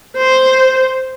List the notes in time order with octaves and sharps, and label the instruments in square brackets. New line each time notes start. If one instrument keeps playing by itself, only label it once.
[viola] C5